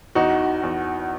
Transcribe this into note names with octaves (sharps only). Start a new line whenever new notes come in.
E2 D#4 F#4
E2